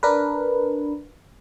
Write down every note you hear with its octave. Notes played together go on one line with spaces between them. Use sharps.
D4 A#4 B4